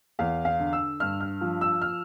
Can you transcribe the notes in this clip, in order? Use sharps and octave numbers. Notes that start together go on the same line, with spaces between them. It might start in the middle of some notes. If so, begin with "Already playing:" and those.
E2 F5
F5
D3
E6
G2 F6
F6
F3
E6
F6